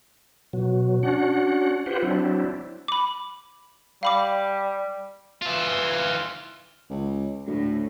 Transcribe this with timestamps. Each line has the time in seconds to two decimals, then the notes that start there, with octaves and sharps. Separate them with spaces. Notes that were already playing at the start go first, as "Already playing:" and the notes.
0.53 B2 F#3
1.03 C#4 D4 F#4 F#5
1.86 F4 G4 B4 C5 F#5
2.02 F#3 C4 D4 E4
2.88 B5 D6
4.03 G3 F5 B5 D6
5.42 E3 F4
6.90 C#2
7.47 D2 A2